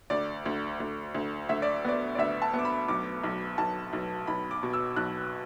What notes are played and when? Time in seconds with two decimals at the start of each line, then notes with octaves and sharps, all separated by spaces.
0.10 D2 D5
0.46 D2
0.80 D2
1.14 D2
1.49 D2 E5
1.62 D5
1.85 B3 D5
2.15 D5
2.18 D2 E5
2.42 A5
2.54 B3
2.59 D6
2.65 B5
2.88 B1 D6
3.24 B1
3.58 B1 A5
3.93 B1
4.27 B1 B5
4.51 D6
4.63 B2
4.73 E6
4.96 B1 F#6